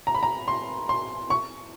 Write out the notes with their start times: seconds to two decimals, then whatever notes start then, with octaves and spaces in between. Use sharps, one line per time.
0.07 A#5
0.15 B5
0.23 A#5
0.48 C6
0.89 C6
1.30 C#6